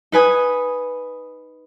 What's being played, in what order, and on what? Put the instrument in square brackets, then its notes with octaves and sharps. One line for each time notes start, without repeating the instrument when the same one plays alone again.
[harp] D#4 B4 G#5 D#6